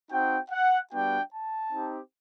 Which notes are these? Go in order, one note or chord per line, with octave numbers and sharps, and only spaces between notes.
C4 D#4 F#4 G5
F#5
G3 B3 D4 F#4 G5
A5
C4 D#4 G4